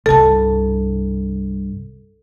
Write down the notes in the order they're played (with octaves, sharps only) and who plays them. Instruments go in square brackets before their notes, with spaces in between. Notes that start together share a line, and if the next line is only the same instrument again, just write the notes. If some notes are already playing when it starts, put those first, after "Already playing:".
[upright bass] C2 G2 [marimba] A4 A5